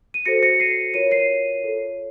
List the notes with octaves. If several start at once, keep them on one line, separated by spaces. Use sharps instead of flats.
D#7
F#4 A4 C5 A#6 C#7
A#6 C#7
C7 D#7
F4 A#4 C#5 D#7
C7 D#7
F4 A4 C#5